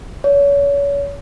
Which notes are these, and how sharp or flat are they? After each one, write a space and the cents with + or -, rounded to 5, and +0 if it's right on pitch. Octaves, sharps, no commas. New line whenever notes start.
C#5 +35